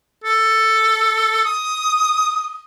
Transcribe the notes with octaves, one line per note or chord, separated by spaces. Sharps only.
A4
D#6